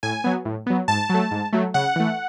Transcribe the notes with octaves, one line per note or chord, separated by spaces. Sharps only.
A2 G#5
F#3 B3
A2
F#3 B3
G#2 A5
F#3 A3
G#2
F#3 A3
C#3 F#5
E3 A3